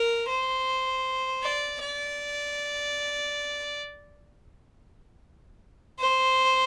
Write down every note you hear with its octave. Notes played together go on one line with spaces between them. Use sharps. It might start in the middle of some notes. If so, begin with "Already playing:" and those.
Already playing: A#4
C5
D5
D5
C5